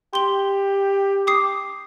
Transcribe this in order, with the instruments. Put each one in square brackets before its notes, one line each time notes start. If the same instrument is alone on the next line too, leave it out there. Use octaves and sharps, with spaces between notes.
[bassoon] G4 [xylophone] C6 G7
[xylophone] D6 D#6 C7